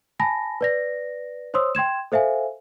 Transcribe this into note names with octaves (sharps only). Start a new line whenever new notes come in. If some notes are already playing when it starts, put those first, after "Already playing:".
G#5 A5 B5 A#6
B4 D5 A#6
C5 C#5 C6 D#6 E6
G5 C6 G#6 E7
A4 C5 E5 F5 G#5